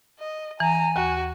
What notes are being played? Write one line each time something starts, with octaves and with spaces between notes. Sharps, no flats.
D#5
E3 G#5 A#5
D#2 F#4